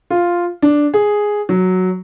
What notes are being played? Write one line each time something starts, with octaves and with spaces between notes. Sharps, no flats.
F4
D4
G#4
F#3